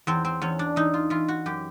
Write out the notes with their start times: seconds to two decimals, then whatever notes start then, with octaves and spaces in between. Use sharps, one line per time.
0.07 E2 C4
0.25 C4
0.42 E2 C#4
0.59 D4
0.76 E3 D#4
0.94 F4
1.10 E3 F4
1.28 F#4
1.46 F#2 G4